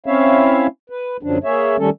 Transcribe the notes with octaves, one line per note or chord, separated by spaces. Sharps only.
C4 C#4 E4 C#5 E5 F5
B4
F#2 D3 F3 F#3 D4
A#3 G#4 C#5 E5
D#3 G3 A3 C#4 A4